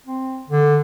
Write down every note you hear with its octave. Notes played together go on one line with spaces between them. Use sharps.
C4
D3